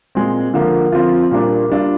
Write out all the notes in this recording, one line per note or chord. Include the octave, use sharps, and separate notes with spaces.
A#2 G#3 C4
D3 F3 A#3
F3 C4 F4
A#2 G3 A#3 D4
G3 D4 F4